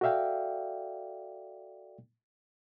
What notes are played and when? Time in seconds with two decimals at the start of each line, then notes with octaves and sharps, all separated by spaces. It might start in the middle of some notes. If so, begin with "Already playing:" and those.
0.01 F#4 A4 D5 E5 F5 G5